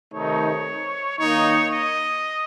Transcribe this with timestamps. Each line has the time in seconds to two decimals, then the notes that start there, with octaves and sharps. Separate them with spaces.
0.14 C3 D#3 A3 D#4 C#5
1.19 D#3 A#3 D#4 C#5
1.72 D#5